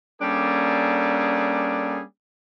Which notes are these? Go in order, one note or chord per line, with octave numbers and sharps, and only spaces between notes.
G3 A#3 C#4 D4 G#4 A4